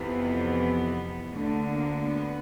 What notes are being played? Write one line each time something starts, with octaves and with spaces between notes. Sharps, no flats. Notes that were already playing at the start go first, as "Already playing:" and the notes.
Already playing: F2 C3 E3 B3
D2 D3 A3
A#3
B3